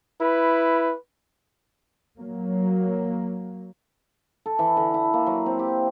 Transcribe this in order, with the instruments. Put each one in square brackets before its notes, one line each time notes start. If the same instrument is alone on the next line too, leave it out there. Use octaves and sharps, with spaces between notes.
[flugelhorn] E4 [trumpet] B4
[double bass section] F#3 A#3
[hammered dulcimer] A4
E3
D3
E4
A#3
F#3
C4
G4